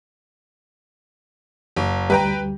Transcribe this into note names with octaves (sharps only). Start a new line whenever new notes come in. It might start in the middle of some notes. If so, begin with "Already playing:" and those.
F#1
D2 G3 B4 G5 A#5